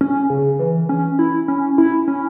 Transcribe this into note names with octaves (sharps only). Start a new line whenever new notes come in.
C#4
C#3
E3
C#4
E4
C#4
E4
C#4